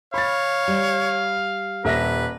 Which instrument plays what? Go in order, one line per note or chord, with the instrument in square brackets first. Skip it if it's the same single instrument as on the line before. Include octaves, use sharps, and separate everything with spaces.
[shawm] C#5 [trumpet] F5 [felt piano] B5 A6
[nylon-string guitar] G3
[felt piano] D#1 E5 A#6 [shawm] B4